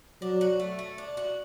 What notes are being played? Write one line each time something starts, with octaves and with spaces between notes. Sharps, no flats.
F#3 D4
F#4
A3
A3
D4
F#4